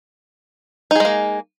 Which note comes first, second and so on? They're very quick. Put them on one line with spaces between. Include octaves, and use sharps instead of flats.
D#4 G#4 G#3 A#3